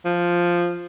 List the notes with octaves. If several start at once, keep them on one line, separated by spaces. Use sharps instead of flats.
F3